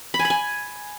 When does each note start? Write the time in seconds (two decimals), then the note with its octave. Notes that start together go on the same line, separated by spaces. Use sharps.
0.14 B5
0.19 G#5
0.25 B5
0.30 G#5